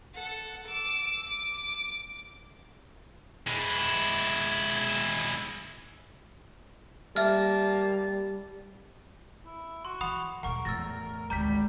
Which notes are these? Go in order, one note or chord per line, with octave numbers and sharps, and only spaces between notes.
A4 F#5
D6 E6
D6
G#3 E4
G3 A#3 E5 A5 F6
E4
F#4 C6
E3 F#5 B5 D#6
D#1 C#3 A#4 F#5 C#6
E2 A2 E6 A6 A#6
G#1 D2 G3 A#5 G6 B6